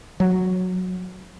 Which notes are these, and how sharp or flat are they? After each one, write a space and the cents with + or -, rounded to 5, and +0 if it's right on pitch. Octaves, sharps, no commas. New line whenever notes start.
F#3 -10